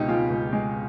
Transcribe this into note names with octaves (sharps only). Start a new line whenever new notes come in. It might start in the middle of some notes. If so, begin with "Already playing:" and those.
Already playing: C#2 B2 D#4 G4
G#3 F4
C#2
G#3